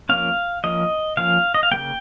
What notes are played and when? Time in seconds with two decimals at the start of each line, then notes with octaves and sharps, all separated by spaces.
0.09 F3 A#3 C#4 F5
0.64 F3 A#3 C#4 D#5
1.17 F3 A#3 C#4 F5
1.54 D#5
1.63 F5
1.71 G3 A#3 G5
1.76 C#3